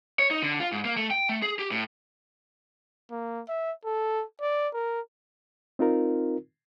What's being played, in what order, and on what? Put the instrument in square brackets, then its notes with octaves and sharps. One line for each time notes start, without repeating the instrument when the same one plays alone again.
[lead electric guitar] C#5
D#4
D3
F4
G#2
A#3
A3
G5
A3
G#4
G4
A2
[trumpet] A#3
E5
A4
D5
A#4
[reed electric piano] C4 D#4 F4 A#4